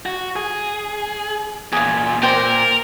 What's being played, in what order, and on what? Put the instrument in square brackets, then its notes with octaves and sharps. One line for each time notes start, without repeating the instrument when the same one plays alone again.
[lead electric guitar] F#4
G#4
[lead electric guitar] E2 A#2 [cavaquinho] F4 G#4
[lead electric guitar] A#2 [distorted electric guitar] A#4 [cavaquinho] C5 D5 G5